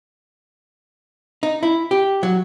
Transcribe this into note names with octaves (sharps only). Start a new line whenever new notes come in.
D#4
E4
G4
F#3